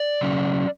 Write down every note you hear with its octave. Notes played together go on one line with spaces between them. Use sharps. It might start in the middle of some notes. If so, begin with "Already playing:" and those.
Already playing: D5
C#3 F#3 C#4